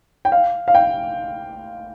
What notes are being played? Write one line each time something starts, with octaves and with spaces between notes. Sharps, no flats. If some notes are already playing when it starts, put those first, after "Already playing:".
G5
F5
F5
G5